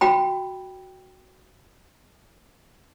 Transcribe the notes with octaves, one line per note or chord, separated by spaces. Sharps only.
F#4 G5 B5